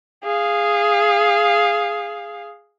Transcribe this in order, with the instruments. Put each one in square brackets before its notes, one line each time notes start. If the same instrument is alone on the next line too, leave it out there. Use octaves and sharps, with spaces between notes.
[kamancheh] G#4 F5